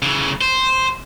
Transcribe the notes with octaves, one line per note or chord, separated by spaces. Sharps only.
C#3 E3
C5